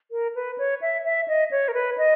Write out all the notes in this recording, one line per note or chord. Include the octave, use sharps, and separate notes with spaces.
A#4
B4
C#5
E5
E5
D#5
C#5
A#4
B4
D#5